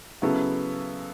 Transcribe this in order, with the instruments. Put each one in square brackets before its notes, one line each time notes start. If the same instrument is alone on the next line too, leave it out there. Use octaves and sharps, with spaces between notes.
[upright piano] C#3 F#3 B3 E4 A4